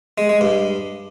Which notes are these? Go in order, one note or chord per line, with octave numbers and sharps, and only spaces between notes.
G#3
G#3
G2